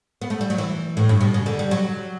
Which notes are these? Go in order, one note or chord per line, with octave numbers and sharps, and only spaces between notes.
B3
A3
G3
F#3
E3
A2
G2
B2
C#3
D3
G3
F#3